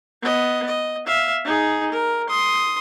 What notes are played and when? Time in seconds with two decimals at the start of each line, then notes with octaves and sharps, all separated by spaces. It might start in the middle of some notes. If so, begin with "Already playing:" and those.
0.22 B3 D#5
0.66 D#5
1.06 E5 F5
1.44 D#4 G#4
1.91 A#4
2.29 C6 D#6